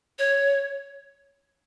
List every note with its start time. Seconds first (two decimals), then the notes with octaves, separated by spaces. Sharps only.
0.19 C#5